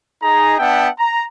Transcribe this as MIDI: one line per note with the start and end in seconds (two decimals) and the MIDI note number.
0.23 0.57 63
0.23 0.57 68
0.23 0.57 82
0.59 0.88 59
0.59 0.88 62
0.59 0.88 76
0.59 0.88 78
0.59 0.88 79
0.59 0.88 81
0.99 1.24 82